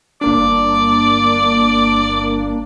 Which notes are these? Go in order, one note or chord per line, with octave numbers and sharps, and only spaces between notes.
G1 A#3 D4 D5